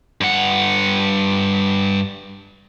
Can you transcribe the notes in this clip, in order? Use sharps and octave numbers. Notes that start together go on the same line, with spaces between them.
G2 F#5